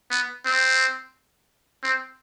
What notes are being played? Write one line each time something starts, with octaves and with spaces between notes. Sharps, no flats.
B3
C4
C4